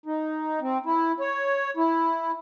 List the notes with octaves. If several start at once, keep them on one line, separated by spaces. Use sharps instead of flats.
D#4
C4
E4
C#5
E4